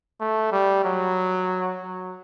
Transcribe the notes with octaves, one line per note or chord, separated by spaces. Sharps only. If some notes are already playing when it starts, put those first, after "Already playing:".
A3
G3
F#3
F#3